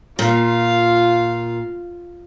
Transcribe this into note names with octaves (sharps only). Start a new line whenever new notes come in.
A#2 F4 F5